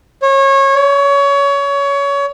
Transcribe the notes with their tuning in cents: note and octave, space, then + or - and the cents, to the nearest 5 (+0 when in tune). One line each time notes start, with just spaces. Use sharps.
C#5 -25
C#5 +25